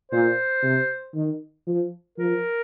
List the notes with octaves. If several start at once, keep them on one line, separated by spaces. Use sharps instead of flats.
A#2 C5
C3
D#3
F3
F3 A#4